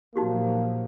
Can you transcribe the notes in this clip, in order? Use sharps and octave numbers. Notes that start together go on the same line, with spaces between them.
A#2 F3 F#3 A#3 D#4 F#4 G4